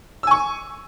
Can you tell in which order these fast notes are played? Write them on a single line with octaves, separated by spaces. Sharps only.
E6 G#5 C#6